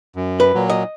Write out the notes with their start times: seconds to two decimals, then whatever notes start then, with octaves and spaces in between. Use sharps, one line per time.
0.16 F#2
0.40 B4
0.54 A#2 F#3
0.70 D#5